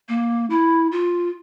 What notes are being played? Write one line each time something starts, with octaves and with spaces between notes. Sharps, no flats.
A#3
E4
F4